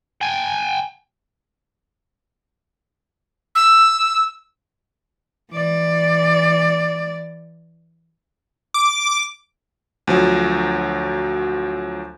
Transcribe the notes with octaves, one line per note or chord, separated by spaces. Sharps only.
G5 G#5
E6
E3 D5
D6
D2 F3 F#3